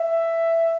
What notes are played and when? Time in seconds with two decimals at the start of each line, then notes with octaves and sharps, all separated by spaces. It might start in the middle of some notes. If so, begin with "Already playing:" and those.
Already playing: E5